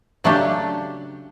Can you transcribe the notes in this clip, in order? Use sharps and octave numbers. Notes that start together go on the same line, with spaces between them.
C#3 F#3 A3 D4 G4